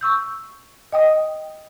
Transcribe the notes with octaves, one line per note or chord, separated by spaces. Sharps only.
C#6 E6 G6
D#5 G5 D#6